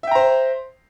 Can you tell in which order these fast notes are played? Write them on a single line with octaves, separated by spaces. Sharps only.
E5 G5 A#5 C5